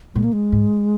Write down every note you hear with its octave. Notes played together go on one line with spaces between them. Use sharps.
A#2 G#3
A#3
G#3
G#2